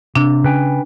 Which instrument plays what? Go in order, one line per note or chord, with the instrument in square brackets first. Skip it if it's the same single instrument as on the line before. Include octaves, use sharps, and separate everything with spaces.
[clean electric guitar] C3 [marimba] D4
[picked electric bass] C#3 [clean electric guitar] B4 G5 G#5